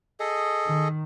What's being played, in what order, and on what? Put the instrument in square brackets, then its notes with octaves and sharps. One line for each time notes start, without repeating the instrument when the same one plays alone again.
[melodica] G#4 A4 D#5
[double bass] D#3